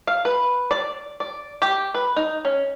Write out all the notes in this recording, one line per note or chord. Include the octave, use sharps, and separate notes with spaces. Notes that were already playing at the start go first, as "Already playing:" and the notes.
F5
B4
D5
D5
G4
B4
D#4
C#4